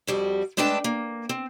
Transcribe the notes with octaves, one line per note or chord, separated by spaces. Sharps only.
F2 G3 F#4
G#3 A3 D4 B4 G5 A5
A#3
C4